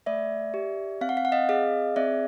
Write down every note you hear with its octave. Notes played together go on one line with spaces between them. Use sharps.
A3 D5 E5
G4
C4 F5
F#5
F5
F#5
D#5 F5
G#4 D#5 F5
C4 D5 E5